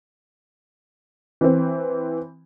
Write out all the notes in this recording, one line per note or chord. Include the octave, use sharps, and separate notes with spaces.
E3 C4